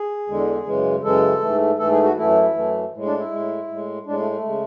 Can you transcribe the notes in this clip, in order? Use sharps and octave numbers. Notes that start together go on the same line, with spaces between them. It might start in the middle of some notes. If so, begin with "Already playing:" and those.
Already playing: G#4
E2 D3 G#3
F#2 C#3 E3 G#3
F#2 C#3 E3 G#3 A4
G#2 E3 A3
G#2 E3 A3 A4
G#4
F#4
F#2 E3 A3 E4
F#2 E3 A3
A2 G#3
D4
E4
A2 G#3
A2 G#3
A2 G#3 D4
A3
A3
C#3 G#3